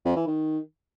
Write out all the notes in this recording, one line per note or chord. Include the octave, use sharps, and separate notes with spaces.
F2
E3
D#3